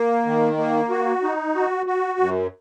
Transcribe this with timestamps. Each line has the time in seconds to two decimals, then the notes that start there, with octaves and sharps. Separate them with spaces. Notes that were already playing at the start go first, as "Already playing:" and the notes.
Already playing: A#3
0.26 D#3
0.57 A#3
0.90 F#4
1.23 D#4
1.55 F#4
1.86 F#4
2.19 F#2